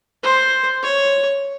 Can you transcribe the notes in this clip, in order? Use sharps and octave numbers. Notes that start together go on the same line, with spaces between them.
C5
C#5